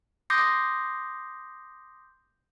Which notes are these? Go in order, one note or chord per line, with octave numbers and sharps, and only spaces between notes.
C6 D6 D#6 G6 A#6 C7